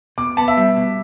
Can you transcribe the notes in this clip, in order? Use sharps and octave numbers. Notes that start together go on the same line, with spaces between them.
B2 D6
B3 A5
E5
G3
B2